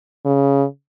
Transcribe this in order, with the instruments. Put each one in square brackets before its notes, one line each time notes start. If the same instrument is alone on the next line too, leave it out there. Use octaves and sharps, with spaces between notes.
[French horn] C#3